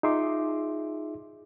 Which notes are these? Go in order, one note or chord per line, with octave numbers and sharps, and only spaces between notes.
D#4 F4 G#4 E5 C6 D6